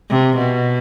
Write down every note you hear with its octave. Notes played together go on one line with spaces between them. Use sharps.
C3
B2